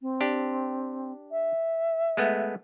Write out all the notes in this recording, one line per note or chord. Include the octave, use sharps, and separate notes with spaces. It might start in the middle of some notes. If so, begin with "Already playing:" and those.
C4
D4 G4
E5
G#3 A3 B3